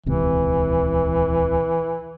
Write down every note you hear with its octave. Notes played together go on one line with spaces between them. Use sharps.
D#1 C#2 C3 E3